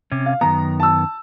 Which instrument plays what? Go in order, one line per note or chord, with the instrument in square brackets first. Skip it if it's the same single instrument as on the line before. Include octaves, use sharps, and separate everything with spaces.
[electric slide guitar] C3 C#4
[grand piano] F5
[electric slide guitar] F#2 D#3 B3 [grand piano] A#5
[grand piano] A5 E6